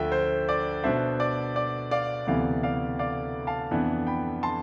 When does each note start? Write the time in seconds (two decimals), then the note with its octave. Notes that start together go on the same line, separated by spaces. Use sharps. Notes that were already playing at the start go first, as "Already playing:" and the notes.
Already playing: D2 D3 F3 E5 G5
0.12 C5
0.49 D5
0.84 B2 B3 D4 C5 E5
1.20 D5
1.56 D5
1.91 D5 F5
2.27 D2 C3 E3 B3 D5 F5
2.63 D5 F5
2.99 D5 F5
3.47 F5 A5
3.71 F2 E3 B3 D4
4.07 G5 B5
4.43 A5 C6